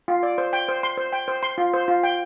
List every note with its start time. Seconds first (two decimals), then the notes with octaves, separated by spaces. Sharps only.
0.08 F4
0.23 D5
0.38 C5
0.53 G5
0.68 C5
0.83 C6
0.97 C5
1.13 G5
1.28 C5
1.43 C6
1.58 F4
1.73 C5
1.88 F4
2.03 G5